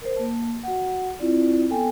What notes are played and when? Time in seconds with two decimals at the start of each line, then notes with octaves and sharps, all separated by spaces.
0.01 A#4 C5
0.16 A#3 A5
0.63 F#4 F#5
1.20 C4 E4 F4 D5
1.70 B3 A4 G5 G#5